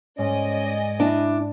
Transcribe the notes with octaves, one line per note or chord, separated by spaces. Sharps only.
G#2 C#4 D5 D#5 G#5
D4 E4